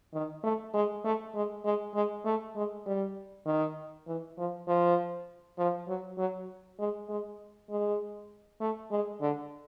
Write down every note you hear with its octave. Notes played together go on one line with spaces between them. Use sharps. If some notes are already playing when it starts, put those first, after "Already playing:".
D#3
A3
G#3
A3
G#3
G#3
G#3
A3
G#3
G3
D#3
E3
F3
F3
F3
F#3
F#3
G#3
G#3
G#3
A3
G#3
D3